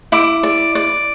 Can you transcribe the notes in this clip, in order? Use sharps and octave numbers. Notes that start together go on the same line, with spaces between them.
E4 D6
D5
D5